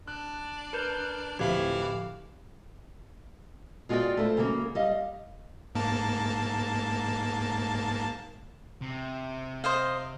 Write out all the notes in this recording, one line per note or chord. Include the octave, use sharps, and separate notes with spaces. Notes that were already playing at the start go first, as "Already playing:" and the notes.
D4 F#6
A#4 B4 G6
D1 F2 E3 A3 G4 F5
G#3 F4 F#4 G#4 D5 G5
A3 E4 C5
C#3 F#3 G#3 A#3 C#4
G3 D#5 F5
G#2 A#3 A5
C3
C5 D#5 F5